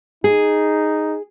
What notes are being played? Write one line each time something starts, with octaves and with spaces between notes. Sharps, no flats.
D#4 G#4